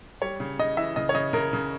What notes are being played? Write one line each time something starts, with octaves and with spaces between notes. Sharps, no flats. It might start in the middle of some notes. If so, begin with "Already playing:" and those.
G3 C#5
C#3
C#3 D#5
E3 E5
C#3 D#5
C#5
C#3 D#5
C#3 A#4
C#3